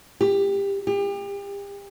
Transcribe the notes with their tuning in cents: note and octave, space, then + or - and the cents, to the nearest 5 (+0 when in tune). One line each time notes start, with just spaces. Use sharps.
G4 +20
G4 +35